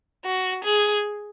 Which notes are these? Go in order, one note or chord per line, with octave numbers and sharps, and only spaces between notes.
F#4
G#4